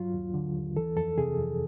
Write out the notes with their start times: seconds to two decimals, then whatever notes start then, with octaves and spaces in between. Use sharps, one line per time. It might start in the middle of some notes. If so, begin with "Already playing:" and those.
Already playing: G2 F#3 F4
0.14 D#2
0.34 D3
0.56 D#2
0.76 E3 A4
0.96 F2 A4
1.17 C3 G#4
1.38 F2